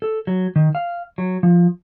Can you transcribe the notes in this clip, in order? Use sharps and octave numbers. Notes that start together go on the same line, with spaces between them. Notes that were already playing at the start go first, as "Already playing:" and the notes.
A4
F#3
D#3
F5
F#3
F3